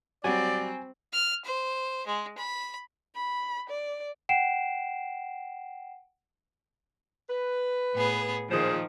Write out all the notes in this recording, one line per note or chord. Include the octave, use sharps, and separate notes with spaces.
F#3 G3 C4 F#4 D5 G#5
F6
C5
G#3
B5
B5
D5
F#5 G5 C7 D7 E7
B4
A2 B3 G#4
A#2 D#3 F3 G#4 C5